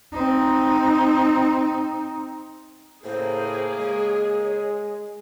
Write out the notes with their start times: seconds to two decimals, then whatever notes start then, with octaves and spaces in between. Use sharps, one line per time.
0.12 C4 D#4
3.05 A2 C#3 A#3 G#4 C5
3.79 G#3 C#5